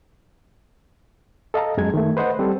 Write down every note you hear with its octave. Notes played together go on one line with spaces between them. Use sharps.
A4 D#5 F5 A5 A#5
F#2 G#3 G#6
D#3 A3
B4 C5 D#5 F#5
G3 C4 G4 A4